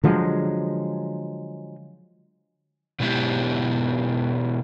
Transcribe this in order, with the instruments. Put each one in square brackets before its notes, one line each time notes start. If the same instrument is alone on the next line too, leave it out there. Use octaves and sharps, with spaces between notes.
[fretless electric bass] D3 F3 F#3 G#3
[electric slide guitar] B2 F#3 G#3 B3 E4 G4